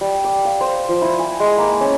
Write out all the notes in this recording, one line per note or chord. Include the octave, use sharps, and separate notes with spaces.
G3
D6
F5
C5
F3
E4
G#5
G#3
A#3
C#4